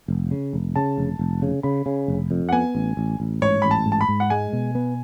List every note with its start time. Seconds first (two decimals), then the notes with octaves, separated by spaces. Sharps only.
0.08 F1
0.31 C#3
0.53 F1
0.76 C#3 A5
0.98 F1
1.19 F1
1.42 C#3
1.63 C#3 B5
1.86 C#3
2.08 F1
2.31 F2
2.49 F#5
2.53 B3 G#5
2.75 A1
2.97 A1
3.20 A1
3.41 G#2 C#5
3.62 A1 B5
3.71 A5
3.86 G#2
3.92 A5
4.01 B5
4.08 G#2
4.20 F#5
4.30 G#3 G#5
4.53 B2
4.75 B3